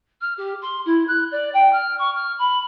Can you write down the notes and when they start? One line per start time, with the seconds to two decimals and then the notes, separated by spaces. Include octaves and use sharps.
0.21 F6
0.37 G4
0.61 C6
0.85 E4
1.07 F#6
1.31 D5
1.53 G5
1.72 F6
1.98 C#6
2.15 F6
2.38 B5